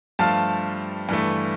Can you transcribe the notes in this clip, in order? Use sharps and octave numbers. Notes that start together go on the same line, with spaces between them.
G2 F3 A3 F5 A5
G2 E3 A3